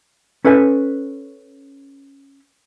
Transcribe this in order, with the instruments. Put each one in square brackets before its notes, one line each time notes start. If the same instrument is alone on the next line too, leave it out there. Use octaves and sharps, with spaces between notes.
[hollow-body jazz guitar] C#4 A4 B4 E5 G5 G#5